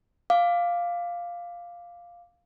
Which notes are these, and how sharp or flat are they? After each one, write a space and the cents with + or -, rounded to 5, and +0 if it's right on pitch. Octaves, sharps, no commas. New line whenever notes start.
F5 +0 D6 +0